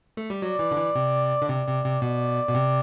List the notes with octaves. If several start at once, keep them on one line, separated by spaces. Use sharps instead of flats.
A3
G3
F#3 D5
E3
D3
E3
C3
D3
C3 D5
C3
C3
B2 D5
B2
C3